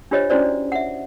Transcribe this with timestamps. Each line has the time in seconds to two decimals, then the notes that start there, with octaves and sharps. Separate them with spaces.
0.11 D4 F4 G4 C5 C#5 D#5
0.30 C#4 D4 E4 F#4 C5 D5
0.72 E5 F#5